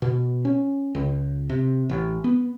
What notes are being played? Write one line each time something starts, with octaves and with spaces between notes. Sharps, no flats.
B2
C#4
C#2
C3
A1
B3